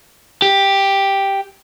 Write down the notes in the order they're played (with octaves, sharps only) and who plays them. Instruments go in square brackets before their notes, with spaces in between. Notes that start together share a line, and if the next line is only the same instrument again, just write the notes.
[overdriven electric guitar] G4